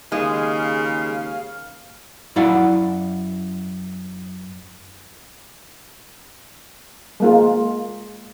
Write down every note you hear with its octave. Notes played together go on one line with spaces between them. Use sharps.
D#2 C#3 G#3 F5
F#2 E4 D5 F5 F#5
G#3 A#3 F4